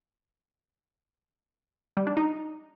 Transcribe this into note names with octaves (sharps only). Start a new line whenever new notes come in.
G3
D4
D#4